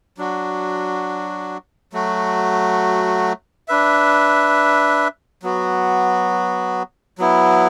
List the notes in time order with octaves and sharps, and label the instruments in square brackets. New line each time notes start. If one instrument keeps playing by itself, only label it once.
[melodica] F#3 D4 F#4
F#3 A3 F#4
D4 B4 E5
F#3 B3 F#4
F#3 B3 E4